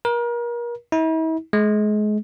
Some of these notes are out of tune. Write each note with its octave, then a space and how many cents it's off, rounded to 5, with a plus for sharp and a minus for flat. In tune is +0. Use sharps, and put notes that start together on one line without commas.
A#4 +35
E4 -45
G#3 +30